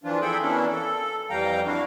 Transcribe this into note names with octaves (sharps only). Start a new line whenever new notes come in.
F2 E3 F3 D4 F4
C4 G#4 A4 E5 G5 B5
B2 E3 A#3 C#4 D4 E4
A4
F2 E3 G3 F5 G5 A#5
D4 E4 F#4 F5